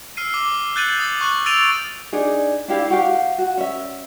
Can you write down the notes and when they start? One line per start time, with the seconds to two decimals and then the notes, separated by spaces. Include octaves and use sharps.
0.17 E6 F6 C7 D#7
0.34 D6
0.76 F#6 G6 A6 C#7 D#7 F#7
1.00 D#6 A6 F#7
1.21 C#6 F#6 F#7
1.46 E6 A6 D7 D#7 F7 G7
2.13 D4 D#4 G#4
2.68 D4 E4 G4 F5
2.90 F#4 G4 F5
3.38 F#4
3.57 C#4 E5